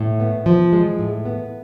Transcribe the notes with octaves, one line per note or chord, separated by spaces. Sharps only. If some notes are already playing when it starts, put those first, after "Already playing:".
Already playing: A2
B3
F3
G#3
A2
B3